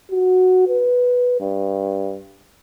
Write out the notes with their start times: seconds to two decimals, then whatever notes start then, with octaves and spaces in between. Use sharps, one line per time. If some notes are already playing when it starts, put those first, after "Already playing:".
0.11 F#4
0.68 B4
1.40 G2